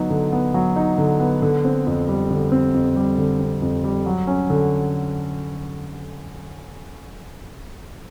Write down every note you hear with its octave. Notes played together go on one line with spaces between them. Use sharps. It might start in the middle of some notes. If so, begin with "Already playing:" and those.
Already playing: D3 F#3 B3 D#4
D3
B3
F#3
D#4
D3
B3
D3
C4
F2
G3
D3
C4
F2
G3
D3
C4
F2
G3
F#3
C#4
D3